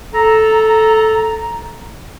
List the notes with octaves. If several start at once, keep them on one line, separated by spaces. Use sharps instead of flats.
A4 A#5